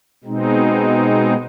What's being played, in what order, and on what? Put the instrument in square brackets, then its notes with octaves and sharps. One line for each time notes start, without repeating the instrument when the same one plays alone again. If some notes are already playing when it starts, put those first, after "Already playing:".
[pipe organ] B2 G#3 C4 D#4